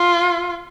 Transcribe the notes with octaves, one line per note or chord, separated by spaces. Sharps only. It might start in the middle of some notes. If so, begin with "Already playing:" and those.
Already playing: F4